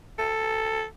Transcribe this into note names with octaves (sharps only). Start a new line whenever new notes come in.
A4